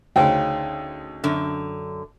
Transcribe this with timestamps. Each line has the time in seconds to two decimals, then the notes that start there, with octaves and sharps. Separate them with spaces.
0.16 D2 C#3 D#4 C5 G5
1.24 F#2 D3